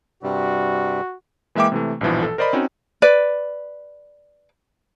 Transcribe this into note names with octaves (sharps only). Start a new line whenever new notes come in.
G2 C3 G3 F#4
E3 G#3 A#3 E5 G5 D6
C3 E3 A3
A#1 G2 B2 E3 F3
A4
A#4 C5 D5 D#5 B5
C4 C#4 D#4 F#4
B4 D5